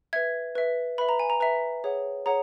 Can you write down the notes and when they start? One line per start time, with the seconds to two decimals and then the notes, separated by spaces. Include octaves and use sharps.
0.13 B4 E5 G#6
0.55 B4 E5
0.98 B4 E5 B5
1.09 A#5
1.20 G#5
1.30 A#5
1.40 B4 E5 A#5
1.84 G#4 C#5 F#5
2.26 G#4 C#5 F#5 A#5